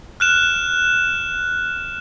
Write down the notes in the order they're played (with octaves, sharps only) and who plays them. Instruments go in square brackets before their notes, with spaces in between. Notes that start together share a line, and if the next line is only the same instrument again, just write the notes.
[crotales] F6 F#6 E7